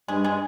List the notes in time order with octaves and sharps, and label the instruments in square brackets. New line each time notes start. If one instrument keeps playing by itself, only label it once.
[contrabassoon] G2 [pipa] G#3
[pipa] G#3